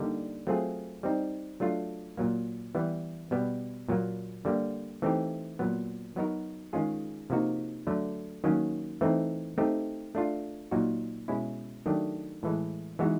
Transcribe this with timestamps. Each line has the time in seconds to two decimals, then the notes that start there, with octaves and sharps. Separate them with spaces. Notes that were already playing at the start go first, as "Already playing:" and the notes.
Already playing: D3 G3 A#3 D#4
0.47 F#3 A3 C4 F4 G#4
1.03 G3 C4 D#4
1.60 F#3 A3 D4 F4
2.17 A#2 F#3 A#3
2.75 E3 G3 B3
3.31 B2 G3 B3
3.88 A#2 F#3 A#3
4.45 D3 G3 A#3
5.02 E3 A3 C4 D#4 G4
5.59 A#2 F#3 B3
6.16 F#3 B3 D#4 F#4 A#4
6.73 D#3 G#3 C#4 F4 G#4
7.30 C3 F3 A#3 D#4 F#4
7.87 D3 F#3 A3
8.44 D#3 F#3 A#3 C#4
9.01 E3 A3 C4 D#4
9.58 A3 C4 D#4 G4
10.15 A3 D4 F4
10.71 A#2 F#3 A#3 D#4 F#4
11.28 B2 G#3 C#4 E4
11.86 D#3 F#3 A3 D4 G4
12.43 A2 E3 G#3
12.99 E3 G#3 B3 D#4 F#4